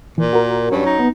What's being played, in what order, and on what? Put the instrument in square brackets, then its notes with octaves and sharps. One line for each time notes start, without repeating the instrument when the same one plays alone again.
[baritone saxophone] A#2 [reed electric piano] E3
[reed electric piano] F#4 A#4
[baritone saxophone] G2 [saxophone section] F#3 C#4
[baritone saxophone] D#4
[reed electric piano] B3